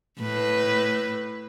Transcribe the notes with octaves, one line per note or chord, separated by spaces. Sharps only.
A2 B4